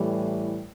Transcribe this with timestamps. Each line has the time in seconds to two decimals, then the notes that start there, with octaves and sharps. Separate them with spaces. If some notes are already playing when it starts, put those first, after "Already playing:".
Already playing: A2 E3 G3